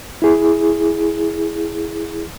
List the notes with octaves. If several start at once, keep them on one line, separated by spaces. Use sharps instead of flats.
E4 G#4